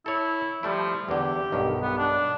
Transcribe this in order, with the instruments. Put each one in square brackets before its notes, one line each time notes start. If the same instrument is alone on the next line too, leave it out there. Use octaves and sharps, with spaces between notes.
[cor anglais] E4 [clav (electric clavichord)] A4 C#5
[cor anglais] F3 [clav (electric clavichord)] G3 A3 E4
[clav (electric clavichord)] E2 D3 [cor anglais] G4
[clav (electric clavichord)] B1 G2 D#3
[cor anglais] B3
D4